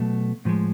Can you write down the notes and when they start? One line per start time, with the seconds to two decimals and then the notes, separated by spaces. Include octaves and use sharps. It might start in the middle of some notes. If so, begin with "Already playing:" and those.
Already playing: B2 F#3 A3
0.45 A2 F3 G#3